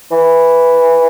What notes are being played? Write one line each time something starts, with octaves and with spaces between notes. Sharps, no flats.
E3